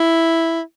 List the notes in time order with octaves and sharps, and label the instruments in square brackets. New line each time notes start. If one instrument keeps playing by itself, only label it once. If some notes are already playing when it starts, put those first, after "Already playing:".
Already playing: [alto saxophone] E4